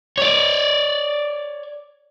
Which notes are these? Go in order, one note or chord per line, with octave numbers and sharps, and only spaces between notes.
C#5 D5